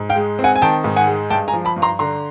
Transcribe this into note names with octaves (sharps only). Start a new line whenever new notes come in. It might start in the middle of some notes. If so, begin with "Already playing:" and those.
Already playing: G#2
F5 G5
G#3
C4
F#5 G#5
G#5
D#3 G5 A5
G#2
F#5 G#5
G#3
G2 G5 A5
G#5 A#5
F3
A5 B5
G2
A#5 C6
D3 A#5 C6